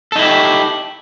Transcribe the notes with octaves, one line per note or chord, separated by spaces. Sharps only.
D#4 E4 G4 A4